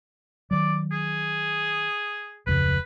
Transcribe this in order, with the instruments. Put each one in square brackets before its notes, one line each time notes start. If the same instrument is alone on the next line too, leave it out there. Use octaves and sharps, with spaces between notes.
[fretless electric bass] D#3 F#3 [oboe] D5
[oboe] G#4
[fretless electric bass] D1 F2 C#3 [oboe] B4